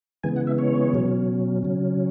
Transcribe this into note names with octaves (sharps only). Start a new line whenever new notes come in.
C#3 E3 G#3 B3 G#5
F#5
E5
C#5
B2 F#3 C#4
C#3 F#3 C#4